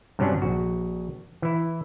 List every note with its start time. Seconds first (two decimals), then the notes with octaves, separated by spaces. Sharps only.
0.19 G2 C3 F#3 C#4 D4
0.42 A#1 F#4
1.42 E3 E4